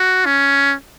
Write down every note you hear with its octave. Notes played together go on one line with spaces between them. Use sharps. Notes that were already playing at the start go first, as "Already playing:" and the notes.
Already playing: F#4
C#4